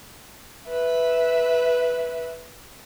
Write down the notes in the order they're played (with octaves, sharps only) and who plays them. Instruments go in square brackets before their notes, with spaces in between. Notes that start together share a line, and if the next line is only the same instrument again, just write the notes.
[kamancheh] B4 E5